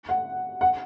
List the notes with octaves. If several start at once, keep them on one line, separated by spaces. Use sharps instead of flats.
F#5
F#5